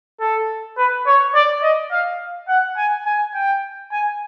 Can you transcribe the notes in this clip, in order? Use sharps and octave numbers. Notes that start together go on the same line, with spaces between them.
A4
B4
C#5
D5
D#5
F5
F#5
G#5
G#5
G5
G#5